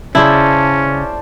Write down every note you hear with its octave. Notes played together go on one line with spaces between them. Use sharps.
C#3 C#4 E4 G#4 C5 D5 A5